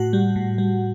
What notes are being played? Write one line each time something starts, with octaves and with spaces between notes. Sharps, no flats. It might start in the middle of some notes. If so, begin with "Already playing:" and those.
Already playing: A2 F#4 F#5
G3
A2
G3